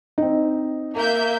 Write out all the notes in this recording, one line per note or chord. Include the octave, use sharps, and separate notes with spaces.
C4 D#4
A#3 E5 G6